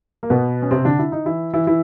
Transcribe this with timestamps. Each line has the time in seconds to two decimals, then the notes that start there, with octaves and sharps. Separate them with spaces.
0.23 A#3
0.30 B2 B3
0.62 C#4
0.71 C3 C4
0.85 D3 D4
0.99 E4
1.12 D#4
1.25 E3 E4
1.54 E3 E4
1.67 E3 E4